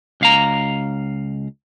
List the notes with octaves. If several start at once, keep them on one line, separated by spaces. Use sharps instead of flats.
C#2 F5 A#5